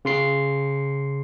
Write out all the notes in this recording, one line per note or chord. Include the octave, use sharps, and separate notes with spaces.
C#3 C6 C7